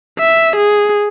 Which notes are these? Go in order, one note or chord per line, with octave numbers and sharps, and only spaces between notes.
E5
G#4